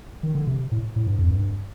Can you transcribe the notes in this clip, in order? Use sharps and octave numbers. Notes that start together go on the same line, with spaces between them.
D#3
D3
C3
A2
A2
G2
F2
G2